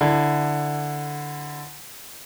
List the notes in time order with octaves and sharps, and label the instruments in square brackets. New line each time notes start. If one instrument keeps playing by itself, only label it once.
[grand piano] D3 E4